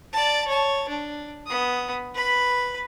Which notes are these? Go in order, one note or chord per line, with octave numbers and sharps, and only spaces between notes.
D5 A5
C#5 A5
D4
B3 D#6
B4 B5